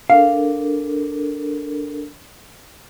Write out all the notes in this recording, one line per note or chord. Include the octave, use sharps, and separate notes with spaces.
D4 A4 A#4 F5